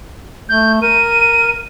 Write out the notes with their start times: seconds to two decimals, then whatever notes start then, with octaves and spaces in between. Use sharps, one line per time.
0.49 A3 G6
0.82 A#4 D#7